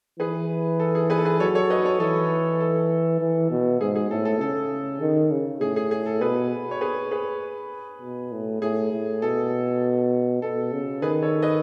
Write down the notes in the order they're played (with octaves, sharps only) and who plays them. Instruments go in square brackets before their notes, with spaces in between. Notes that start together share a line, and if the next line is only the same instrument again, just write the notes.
[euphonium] E3 [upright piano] G#4 B4
[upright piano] A4
G#4
G#4 B4
A4
G#4 B4
[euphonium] F#3 [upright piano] A4 C#5
[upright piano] A4 C#5
B4 D#5
A4 C#5
[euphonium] E3 [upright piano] A4
[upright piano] A4
[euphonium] E3
B2
[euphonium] G#2 [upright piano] G#4
[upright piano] G#4
[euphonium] A2 [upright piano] A4
[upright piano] A4
[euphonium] C#3 [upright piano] A4
[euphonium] D#3
C#3
[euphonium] A2 [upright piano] G#4
[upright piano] G#4
G#4
A4
[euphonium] B2 [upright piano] G#4 B4
[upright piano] C#5
G#4 B4
G#4 B4
[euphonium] B2
A2
[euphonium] A2 [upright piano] G#4
[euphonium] A2
[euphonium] B2 [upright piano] A4
[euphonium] B2 [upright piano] A4
[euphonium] C#3
[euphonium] D#3 [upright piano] G#4 B4
[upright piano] A4 C#5
B4 D#5